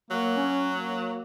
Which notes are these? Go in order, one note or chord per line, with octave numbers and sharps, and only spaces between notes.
F#3 A#3
C#4
A#3